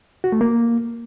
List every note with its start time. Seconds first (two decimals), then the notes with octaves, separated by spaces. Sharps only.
0.24 F#4
0.32 A3
0.41 A#3